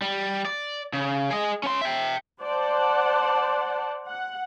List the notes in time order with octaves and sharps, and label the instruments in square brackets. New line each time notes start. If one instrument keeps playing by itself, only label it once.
[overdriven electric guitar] G3
D5
C#3
G#4 D#5
C#4 C6
E5 G5
[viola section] C5 D5 F#5 A5
F#5